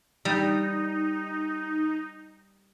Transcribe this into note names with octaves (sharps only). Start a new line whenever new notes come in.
G3 D#4